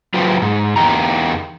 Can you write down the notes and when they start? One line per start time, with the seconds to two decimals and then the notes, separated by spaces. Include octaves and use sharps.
0.14 F#3 F4 G4 B4 C5
0.42 G#2
0.76 E2 G#2 D#4 G4 A#5